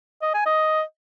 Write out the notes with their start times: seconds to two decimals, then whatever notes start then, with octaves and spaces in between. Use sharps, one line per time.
0.22 D#5
0.34 G#5
0.46 D#5